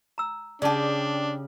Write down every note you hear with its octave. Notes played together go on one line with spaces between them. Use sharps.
A#5 E6
C#3 D4 G4 D5 A5